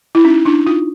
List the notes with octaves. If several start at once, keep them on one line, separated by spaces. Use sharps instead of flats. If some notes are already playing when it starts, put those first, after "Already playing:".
E4
C#4 D#4
D4 E4
D#4 F4